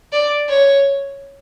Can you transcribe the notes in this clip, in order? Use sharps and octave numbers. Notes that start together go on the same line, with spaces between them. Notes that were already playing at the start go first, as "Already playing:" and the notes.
D5
C#5